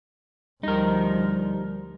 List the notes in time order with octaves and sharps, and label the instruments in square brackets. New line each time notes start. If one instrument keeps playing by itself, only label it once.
[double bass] D2 F3 [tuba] G3 [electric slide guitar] D#4 A#4